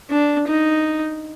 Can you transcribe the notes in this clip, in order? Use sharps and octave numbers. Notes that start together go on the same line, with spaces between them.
D4
D#4